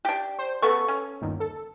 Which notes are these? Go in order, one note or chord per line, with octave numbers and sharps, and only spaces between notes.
D4 G4
C5
C#3 B3 A4 C#6
C#4
G1 D#2
A4